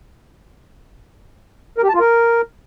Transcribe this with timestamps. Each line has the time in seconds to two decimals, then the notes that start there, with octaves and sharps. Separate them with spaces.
1.78 A#4
1.83 G4
1.89 A5
1.94 F4
2.00 A#4